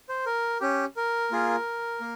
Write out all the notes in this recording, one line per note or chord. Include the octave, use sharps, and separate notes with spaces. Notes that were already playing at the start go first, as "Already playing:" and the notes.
C5
A#4
C#4 G4
A#4
A#3 F4 G#4
A#3